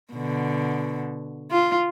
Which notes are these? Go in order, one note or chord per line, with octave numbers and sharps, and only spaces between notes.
B2 D3
F4